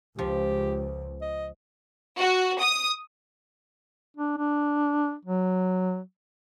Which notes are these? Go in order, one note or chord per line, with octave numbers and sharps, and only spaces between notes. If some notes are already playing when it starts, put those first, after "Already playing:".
C#2 F3 G4
D#5
F#4
D#6
D4
D4
F#3